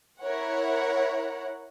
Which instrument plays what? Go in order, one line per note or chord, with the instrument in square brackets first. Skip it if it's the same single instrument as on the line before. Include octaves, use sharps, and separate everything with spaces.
[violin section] E4 A#4 C#5 F#5